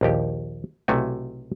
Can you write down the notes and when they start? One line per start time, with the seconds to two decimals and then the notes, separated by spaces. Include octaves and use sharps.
0.01 A#1 D#2 G4
0.88 B1 C3 A3 E4 F#4 G#5